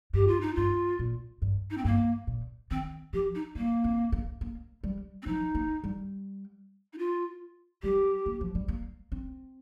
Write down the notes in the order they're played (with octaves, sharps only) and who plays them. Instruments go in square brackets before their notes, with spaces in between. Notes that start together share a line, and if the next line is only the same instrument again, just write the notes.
[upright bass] G2 [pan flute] G4
[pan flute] F4
D#4
[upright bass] G2 [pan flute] F4
[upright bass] A#2
G2
[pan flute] D#4
C4
[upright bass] G2 [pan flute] A#3
[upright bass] A#2
[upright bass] D#3 [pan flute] C4
[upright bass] F3 [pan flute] G4
[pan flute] D#4
[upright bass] G3 [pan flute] A#3
[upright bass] C4
A#3
A#3
G3
[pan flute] C4
[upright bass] F3 [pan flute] D#4
[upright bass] A#3
G3
[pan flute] D#4
F4
[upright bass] G3 [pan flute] G4
[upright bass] A#3
F3
G3
A#3
C4